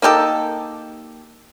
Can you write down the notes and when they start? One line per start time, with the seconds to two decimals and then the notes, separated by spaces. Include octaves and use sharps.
0.02 A#3 D#4 G4 A4